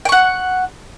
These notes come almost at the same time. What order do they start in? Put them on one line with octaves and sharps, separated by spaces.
G5 C#6 F#5